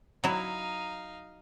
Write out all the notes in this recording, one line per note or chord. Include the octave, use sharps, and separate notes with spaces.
F#3 D#4 E4 F5